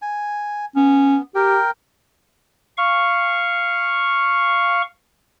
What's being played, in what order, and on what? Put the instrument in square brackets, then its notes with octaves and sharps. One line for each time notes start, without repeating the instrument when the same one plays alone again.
[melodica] G#5
[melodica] B3 [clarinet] C#4
[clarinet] G4 [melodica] A#4 G5
[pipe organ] F5 C#6